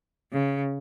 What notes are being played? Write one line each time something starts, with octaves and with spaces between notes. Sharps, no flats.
C#3